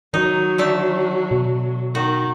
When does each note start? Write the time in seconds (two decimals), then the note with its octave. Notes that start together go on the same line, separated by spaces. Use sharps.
0.14 D#3 F#3 D#4
0.58 D3 A3 A5
1.31 B2
1.95 D#3 F#4